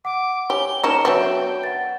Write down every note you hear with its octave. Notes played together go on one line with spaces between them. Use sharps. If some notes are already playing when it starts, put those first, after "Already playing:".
F#5 D6
G4 C#5 G#5 G7
A#3 C#4 D#4 A5 C#7 E7
F#3 B3 D4 C#5 E5 G5
F#5 A6